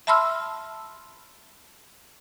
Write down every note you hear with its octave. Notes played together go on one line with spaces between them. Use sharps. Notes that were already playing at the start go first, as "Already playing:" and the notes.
E5 A5 B5 C6 E6 F6